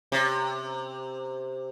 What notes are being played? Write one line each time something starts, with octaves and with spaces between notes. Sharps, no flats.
C3